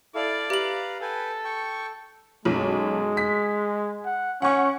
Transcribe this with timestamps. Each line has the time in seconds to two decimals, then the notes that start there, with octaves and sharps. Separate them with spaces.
0.15 E4 A4 D5 F5
0.50 G4 B4 F5 A#5 F#7
1.02 A4 B4 G5 G#5
1.45 G5 C#6
2.45 B1 F#2 G#3
3.17 B6
4.05 F#5
4.42 C#4 F#5 C#6